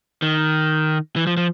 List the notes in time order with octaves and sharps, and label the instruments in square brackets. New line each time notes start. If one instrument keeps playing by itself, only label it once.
[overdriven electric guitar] D#3
E3
F3
F3